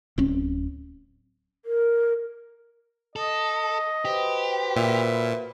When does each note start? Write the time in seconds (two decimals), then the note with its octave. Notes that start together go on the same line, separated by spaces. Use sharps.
0.18 D1 C4 C#4
1.65 A#4
3.16 A4 D#5
4.05 F#4 G4 B4 C5
4.76 A#2 E5